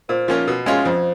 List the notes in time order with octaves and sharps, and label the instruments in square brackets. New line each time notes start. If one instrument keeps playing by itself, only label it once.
[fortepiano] A#2 [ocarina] C5
[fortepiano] F3 A#3 C#4 F4
B2
G#3 C#4 F4 G#4
[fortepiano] F2 [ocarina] C5